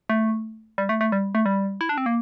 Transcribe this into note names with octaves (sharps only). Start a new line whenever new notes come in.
A3
G3
A3
A3
G3
A3
G3
E4
D4
C4
A#3